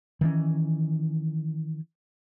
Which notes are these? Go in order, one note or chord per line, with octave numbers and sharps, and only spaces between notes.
D#3 E3 C#4